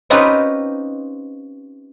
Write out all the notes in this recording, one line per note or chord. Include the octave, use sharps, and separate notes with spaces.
C4 C#4 D#4 F4 G4 B4